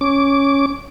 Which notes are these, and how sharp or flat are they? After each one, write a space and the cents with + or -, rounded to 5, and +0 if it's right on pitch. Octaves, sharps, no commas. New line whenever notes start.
C#4 +0 D6 -15